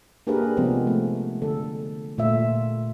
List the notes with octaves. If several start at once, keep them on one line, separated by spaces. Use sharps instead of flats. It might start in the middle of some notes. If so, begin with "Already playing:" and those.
A#3 D4 G4 G#4 A#4 B4
C3 F3 G#3 B3 C4
A3
D3 A4
A#2 A3 F4 E5